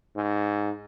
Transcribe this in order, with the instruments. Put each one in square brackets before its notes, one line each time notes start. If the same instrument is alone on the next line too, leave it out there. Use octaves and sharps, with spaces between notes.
[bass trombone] G#2